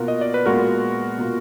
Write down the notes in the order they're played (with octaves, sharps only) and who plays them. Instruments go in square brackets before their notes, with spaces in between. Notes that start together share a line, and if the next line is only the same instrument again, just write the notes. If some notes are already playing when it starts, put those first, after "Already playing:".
Already playing: [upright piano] B2 A#3 F4 [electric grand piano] F#4 A#4
[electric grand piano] D#5
D5
B4
[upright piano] A#2 G#3 B3 F4 [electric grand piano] F#4 A#4
[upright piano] B2 A#3 F4